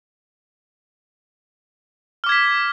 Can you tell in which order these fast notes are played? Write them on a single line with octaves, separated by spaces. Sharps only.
F6 D6 G#6 B6